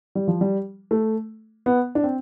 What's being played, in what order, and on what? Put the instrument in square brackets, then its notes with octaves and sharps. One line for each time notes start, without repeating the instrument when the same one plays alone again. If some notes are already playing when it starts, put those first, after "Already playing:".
[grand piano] G3
F3
G3
A3
B3
D4
C4